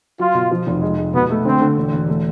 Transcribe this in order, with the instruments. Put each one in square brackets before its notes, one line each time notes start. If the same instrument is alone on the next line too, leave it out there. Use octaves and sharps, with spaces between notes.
[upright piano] F#3 [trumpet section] F4
[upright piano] B2
F3
F1
G#3
G#3
[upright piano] B2 [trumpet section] B3
[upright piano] A3
[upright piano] D3 [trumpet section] C4
[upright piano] D3
E1
E1
A3